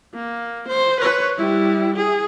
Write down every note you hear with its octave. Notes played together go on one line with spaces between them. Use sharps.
A#3
C5
B4 C#5
G3 E4
G#4